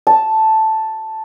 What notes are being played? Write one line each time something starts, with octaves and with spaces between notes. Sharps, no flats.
A5